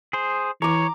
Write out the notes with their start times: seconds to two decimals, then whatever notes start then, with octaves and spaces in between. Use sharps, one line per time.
0.13 G#4 C5
0.62 E3 C#5 A#5 D6